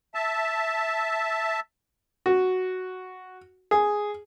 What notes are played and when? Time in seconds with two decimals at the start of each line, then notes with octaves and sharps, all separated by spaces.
0.15 E5 A5
2.26 F#4
3.71 G#4